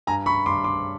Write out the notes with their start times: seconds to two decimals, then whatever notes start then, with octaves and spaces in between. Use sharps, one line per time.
0.07 G2 G#5 A#5
0.26 B5 C#6
0.46 G2 C6 D6
0.64 C6 D6